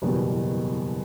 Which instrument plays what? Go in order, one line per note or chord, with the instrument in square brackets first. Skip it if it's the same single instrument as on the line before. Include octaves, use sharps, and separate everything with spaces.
[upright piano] F#1 E2 B2 G3